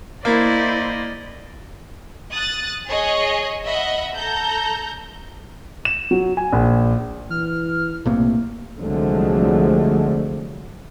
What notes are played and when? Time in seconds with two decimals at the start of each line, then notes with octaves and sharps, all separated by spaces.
0.25 A#3 E4 C5 D5 D#5
2.32 D#6 F#6 A6
2.89 G#4 C#5 D#5
3.65 D#5 E5 F#5 B5
4.16 A4 A#5 G6
5.85 E7
6.11 F#3
6.37 G#5
6.52 A#1
7.30 E3 F6
8.05 B1 A2 C3 A#3
8.79 C2 D3 F3 F#3 G#3 A3